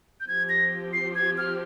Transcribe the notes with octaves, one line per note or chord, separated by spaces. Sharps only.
G6
F3 C4 G4 G#6
A#6
C7
G#6
F6